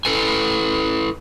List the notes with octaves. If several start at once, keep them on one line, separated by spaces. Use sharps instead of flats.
E4 A4 B4 G#5